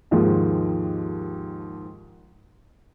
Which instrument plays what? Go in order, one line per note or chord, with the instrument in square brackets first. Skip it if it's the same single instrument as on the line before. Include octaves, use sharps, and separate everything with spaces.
[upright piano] D#2 G#2 D#3 F3